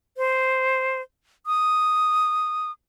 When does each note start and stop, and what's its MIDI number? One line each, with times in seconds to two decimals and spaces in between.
0.17 1.01 72
1.46 2.71 87